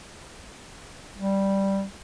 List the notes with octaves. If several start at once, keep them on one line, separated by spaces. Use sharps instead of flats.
G3